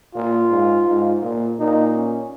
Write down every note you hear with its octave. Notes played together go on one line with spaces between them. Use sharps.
A#2 F4
G#2
G#2
A#2
A#2 D#4
C#4